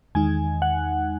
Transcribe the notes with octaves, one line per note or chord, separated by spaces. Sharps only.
E2 D#3 G#3 D#4 G#5
F#5